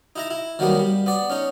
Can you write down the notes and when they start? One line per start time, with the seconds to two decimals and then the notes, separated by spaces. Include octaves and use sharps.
0.16 D#4 E4 A#5
0.30 E4
0.59 D#3 F#3 G3 A#3 B3
0.79 G3
1.06 B3 D5
1.30 C#4 D#4